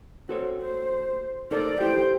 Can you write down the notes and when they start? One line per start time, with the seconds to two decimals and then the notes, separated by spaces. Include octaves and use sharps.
0.29 C4 F#4 A4 C#5
0.61 C5
1.51 D#4 A4 A#4 C5 D5
1.80 E4 G4 A4 C5 G5